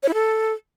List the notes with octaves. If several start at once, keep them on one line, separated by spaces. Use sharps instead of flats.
C#5
E4
A4